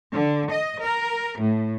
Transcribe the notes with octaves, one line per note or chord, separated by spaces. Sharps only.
D3
D#5
A#4
A2